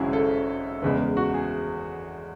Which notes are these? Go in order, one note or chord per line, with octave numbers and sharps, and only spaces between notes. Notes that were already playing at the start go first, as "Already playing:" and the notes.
Already playing: G#1 F#2 C#3 G#3 E4 F#4 G#4
A4
F#1 E2 C#3 G#3 B4
F#4
G#4